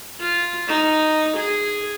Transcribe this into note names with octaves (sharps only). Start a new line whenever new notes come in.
F4
D#4
G#4